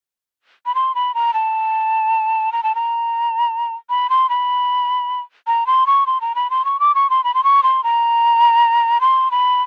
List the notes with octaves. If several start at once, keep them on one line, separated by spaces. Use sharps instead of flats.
B5
C6
B5
A#5
A5
A#5
A5
A#5
B5
C6
B5
A#5
C6
C#6
C6
A#5
B5
C6
C#6
D6
C#6
C6
B5
C6
C#6
C6
A#5
C6
B5